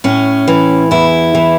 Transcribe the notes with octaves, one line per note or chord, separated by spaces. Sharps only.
A2 C#4
E3
E2 E4
E3